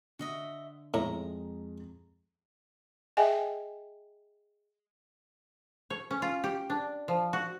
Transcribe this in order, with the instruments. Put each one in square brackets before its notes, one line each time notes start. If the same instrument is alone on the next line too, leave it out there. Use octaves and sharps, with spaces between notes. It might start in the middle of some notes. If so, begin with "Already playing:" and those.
[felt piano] D3 [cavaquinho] F#4 D#5 E5
[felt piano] F2 G#3 [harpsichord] A2 [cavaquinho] A#5
[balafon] G#4 D#5 E5 G5 G#5
[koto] C#5
C#4
F4
G4
D4
F3
F#4